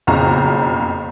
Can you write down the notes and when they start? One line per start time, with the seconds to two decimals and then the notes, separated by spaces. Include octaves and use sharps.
0.07 F#1 B1 F2 C#3 A#5